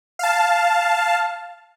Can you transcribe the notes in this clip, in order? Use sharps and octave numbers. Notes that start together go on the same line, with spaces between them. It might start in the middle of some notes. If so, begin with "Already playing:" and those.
F5 A5